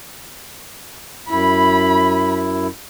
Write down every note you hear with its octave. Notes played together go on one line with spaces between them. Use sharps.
F#2 E4 B5